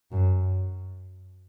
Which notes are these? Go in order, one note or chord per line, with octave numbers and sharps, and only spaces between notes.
F#2